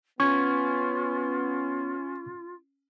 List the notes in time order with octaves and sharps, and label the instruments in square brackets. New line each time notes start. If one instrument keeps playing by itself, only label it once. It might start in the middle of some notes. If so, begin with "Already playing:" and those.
[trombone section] B3 [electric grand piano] C#4 [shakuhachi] F4 [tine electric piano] C#6 G#6